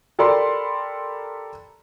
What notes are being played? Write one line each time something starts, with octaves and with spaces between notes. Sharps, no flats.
G4 A4 A#4 D5 B5 C6